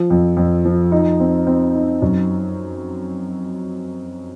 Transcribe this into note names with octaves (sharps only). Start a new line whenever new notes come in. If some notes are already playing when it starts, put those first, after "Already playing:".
Already playing: F3
F2
F2
F3
D#4
C4
C4
D#4
F#2